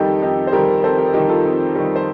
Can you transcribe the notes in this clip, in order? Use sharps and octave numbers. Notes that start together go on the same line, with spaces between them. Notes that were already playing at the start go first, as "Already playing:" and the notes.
Already playing: F2 D#3 G3 D#4 G4 A4
F2 D#4 G4
C5
D#3 G3 G4 A#4
F2 A4 C5
G4 A#4
D#3 G3 D#4 G4
F4 A4
F2
D#3 G3
C5